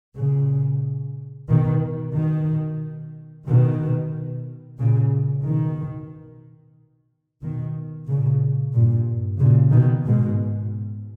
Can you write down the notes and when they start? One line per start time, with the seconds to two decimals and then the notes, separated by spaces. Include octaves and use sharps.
0.17 A#2 C#3
1.49 B2 D#3
2.15 B2 D#3
3.47 B2 D#3
4.78 A#2 C#3
5.44 B2 D#3
7.42 B2 D#3
8.08 A#2 C#3
8.73 G2 A#2
9.39 A#2 C#3
9.72 B2 D#3
10.06 G#2 B2